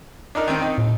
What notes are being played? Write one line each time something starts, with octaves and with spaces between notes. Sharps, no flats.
D4 D#4 A#4
D#3 C4
D#4
A2